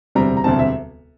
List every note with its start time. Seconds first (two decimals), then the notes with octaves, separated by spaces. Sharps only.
0.15 E1 D2 C3 G3 C4 A#5
0.37 A#5
0.44 E1 D2 C3 G3 C4 A5
0.59 E5